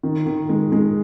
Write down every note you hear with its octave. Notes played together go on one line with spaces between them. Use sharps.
D#3
D#3
G#3
G#3